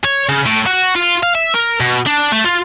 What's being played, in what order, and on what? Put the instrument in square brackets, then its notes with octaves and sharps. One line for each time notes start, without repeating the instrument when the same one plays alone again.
[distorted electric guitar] C#5
C#3
A2
F#4
F4
F5
E5
A#4
B2
D4
A3
F4